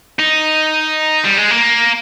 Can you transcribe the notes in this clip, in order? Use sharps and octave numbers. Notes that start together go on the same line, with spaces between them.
D#4
G3
G#3
A#3